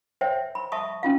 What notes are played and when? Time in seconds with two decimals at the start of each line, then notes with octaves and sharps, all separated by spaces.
0.21 C5 C#5 E5 G5
0.55 B5
0.72 E5 A5 C#6 D#6
1.03 C#4 F4 F5